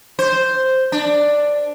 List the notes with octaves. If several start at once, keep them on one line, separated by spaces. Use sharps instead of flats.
C5
D4